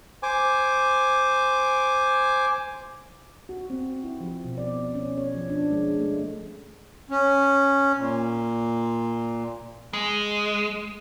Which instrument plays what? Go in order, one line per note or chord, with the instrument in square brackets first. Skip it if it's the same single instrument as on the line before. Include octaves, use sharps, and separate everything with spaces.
[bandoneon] C5 G#5 D6
[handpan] F#4
C4
E4
F3
B2
D5
C#4
C#5
F3
D4
G#3
A3
[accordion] C#4
A#2
[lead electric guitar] G#3